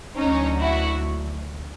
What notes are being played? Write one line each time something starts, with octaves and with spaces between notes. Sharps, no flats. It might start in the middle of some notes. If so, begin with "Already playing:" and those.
D2 D3 F#3 C#4 D#4
E4 F#4